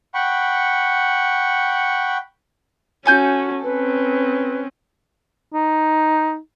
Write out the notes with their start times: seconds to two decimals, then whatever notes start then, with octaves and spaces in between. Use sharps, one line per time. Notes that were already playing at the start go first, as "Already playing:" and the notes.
0.14 F#5 G5 B5 C#6
3.06 C#4 F#4 A4 G#5 G6
3.63 C4 C#4 B4
5.54 D#4